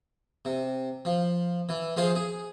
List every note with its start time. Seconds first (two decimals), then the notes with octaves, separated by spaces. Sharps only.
0.45 C3
1.05 F3
1.69 E3
1.96 F3 F4 G#4 C5
2.15 G#4